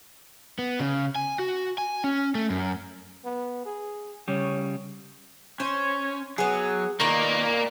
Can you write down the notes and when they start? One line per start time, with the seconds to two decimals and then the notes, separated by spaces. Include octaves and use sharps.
0.59 B3
0.80 C#3
1.16 G#5
1.39 F#4
1.78 G#5
2.04 C#4
2.35 A3
2.50 F#2
3.24 B3
3.66 G#4
4.28 C#3 G3 C#5
5.60 C#4 C5
6.38 F#3 B3 G#4
7.00 D#3 A#3 D#4 A#4 B4 D5